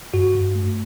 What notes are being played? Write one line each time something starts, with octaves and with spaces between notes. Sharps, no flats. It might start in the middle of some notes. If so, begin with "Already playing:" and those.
G2 F#4
G2
A3